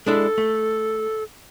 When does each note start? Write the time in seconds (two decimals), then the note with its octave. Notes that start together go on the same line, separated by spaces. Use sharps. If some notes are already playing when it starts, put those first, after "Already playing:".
0.07 G#3 D4 E4 A4
0.38 A3